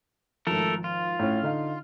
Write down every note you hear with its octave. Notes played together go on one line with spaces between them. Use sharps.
G#1 F3 A3 A4 A#4
F4
A2 C#4
D3 D#4 F5